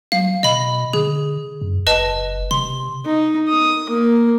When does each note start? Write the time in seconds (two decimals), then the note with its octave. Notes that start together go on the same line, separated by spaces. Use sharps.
0.12 F#3 F5
0.43 B2 D#5 B5
0.93 D3 G#4
1.61 F#2
1.87 F#1 B4 D#5 A5
2.51 C3 C6
3.05 D#4
3.48 D#6
3.89 A#3